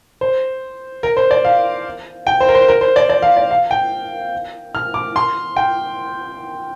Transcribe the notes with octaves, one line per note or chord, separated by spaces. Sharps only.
C5
A#4
C5
D5
F5
G5
C5
A#4
C5
A#4
C5
D5
D5
F5
D5
F5
G5
F6
D6
C6
G5